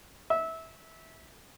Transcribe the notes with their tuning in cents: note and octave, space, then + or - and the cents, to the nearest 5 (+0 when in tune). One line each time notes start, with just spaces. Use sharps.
E5 -20